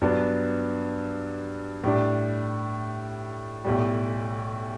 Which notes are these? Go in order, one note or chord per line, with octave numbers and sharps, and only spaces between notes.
G2 F#3 B3 D4
A2 G3 D4
B1 A2 G3